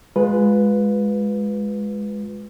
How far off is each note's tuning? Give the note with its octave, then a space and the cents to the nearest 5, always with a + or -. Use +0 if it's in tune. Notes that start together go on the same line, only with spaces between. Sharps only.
G#3 +0 F4 +25 B4 +0